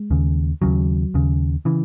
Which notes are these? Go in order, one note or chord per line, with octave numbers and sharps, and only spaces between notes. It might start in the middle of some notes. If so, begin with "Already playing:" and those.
Already playing: G#3
D#2 C#3
D#2 C#3 F#3
D#2 C#3
C#3 E3